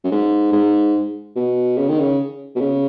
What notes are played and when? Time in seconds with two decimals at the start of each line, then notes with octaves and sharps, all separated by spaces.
0.04 F#2
0.11 G#2
0.52 G#2
1.36 B2
1.78 C#3
1.89 D#3
2.00 C#3
2.56 B2
2.61 C#3